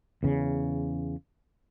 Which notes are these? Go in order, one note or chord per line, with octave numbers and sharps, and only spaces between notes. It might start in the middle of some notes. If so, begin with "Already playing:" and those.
E2 C#3